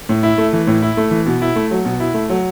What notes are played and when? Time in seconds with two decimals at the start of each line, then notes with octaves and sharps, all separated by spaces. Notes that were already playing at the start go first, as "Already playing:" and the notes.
0.09 A2
0.23 E4
0.38 A3
0.53 E3
0.67 A2
0.82 E4
0.97 A3
1.11 E3
1.26 B2
1.42 E4
1.56 A3
1.71 F#3
1.85 B2
2.00 E4
2.14 A3
2.30 F#3